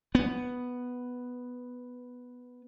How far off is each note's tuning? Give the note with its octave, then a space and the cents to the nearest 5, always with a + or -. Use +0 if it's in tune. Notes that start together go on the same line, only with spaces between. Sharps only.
B3 +0